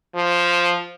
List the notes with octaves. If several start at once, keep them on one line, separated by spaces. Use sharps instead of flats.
F3